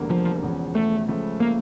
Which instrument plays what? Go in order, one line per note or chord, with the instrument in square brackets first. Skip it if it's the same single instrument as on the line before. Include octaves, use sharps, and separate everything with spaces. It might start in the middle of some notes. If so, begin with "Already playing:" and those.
Already playing: [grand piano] F1 E2 D3 G3 A#3
[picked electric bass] F3
[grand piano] E1 E2 C#3 F3
[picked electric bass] A3
[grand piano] C#2 C#3 F3 A3
[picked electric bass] A#3